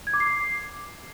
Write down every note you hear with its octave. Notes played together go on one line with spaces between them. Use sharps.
G#6
D6
C7